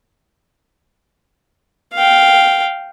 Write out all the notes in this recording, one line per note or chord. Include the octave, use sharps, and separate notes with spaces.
F5 G5